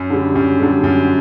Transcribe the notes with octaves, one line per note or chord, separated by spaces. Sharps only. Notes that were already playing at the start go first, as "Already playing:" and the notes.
Already playing: F#2
D3 G3
F#2
D3 G3
F#2